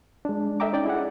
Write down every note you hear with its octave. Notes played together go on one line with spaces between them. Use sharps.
G#3 D4
A4 D#5 E5 G5 A#5 D6
C#4 D#4 D5 G5
E4 G#4 F#5